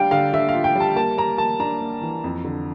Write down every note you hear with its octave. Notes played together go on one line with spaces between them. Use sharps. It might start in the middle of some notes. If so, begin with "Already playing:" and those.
Already playing: G3 D4 F5 G5
D3 F5
D3 E5
F4 F5
G5
G3 A5
A#3 A5
A#3 A#5
A#3 A5
D4 A#5
A#3
E3
F2
D3